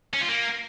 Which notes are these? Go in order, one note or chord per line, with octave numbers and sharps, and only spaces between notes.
C#4
F4
A#3